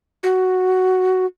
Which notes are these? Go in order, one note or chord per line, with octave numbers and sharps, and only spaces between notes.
F#4